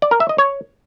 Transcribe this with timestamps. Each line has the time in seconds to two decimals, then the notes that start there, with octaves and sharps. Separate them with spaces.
0.02 D5
0.11 A#4
0.20 E5
0.29 D#5
0.38 C#5